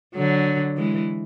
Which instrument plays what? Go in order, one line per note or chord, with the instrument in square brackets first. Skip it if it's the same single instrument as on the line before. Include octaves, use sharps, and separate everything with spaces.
[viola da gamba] D3 F#3
E3 G#3